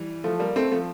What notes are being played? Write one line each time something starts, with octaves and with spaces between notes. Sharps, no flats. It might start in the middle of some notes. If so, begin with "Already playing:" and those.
Already playing: E3 G3
F3 A3
G3 A#3
A3 C4
F3 A3